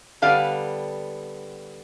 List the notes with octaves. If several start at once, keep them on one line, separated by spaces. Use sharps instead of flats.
D3 G3 B3 F5